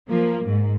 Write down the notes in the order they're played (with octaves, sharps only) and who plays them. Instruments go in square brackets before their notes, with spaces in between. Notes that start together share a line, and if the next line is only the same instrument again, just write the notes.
[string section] F3 A#3
G#2